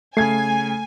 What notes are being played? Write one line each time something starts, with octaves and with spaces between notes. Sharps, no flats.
C#3 A3 G#5 G#6 C7